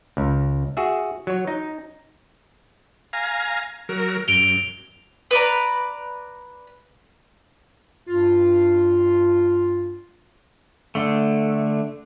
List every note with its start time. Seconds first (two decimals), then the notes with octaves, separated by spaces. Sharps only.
0.17 C#2
0.77 F#4 G#4 E5
1.27 F#3 C#5
1.47 D#4
3.13 F5 G#5 A#5
3.89 F#3 A#4
4.28 F#2 D7 F7 G7
5.31 B4 D5 A#5
8.08 G2 F4
10.95 D3 A3